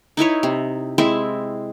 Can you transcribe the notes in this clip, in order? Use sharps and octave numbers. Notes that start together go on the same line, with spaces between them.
D#4 E4 B4 C#5
C3
G#3 C4 E4 E5